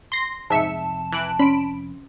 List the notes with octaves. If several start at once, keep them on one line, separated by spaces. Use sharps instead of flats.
C6 A#6
F2 G#2 C3 E5 A5 C#7
E3 F#6 D7
C#4 D5 B5 C6 D7